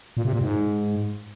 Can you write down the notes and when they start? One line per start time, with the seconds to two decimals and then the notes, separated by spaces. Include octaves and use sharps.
0.17 A#2
0.25 C3
0.33 A#2
0.41 G#2